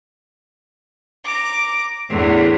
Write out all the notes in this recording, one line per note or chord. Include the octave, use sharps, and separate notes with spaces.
A#5 D6
E2 A2 D3